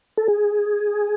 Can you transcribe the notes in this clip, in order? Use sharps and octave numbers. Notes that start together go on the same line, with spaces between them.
A4
G#4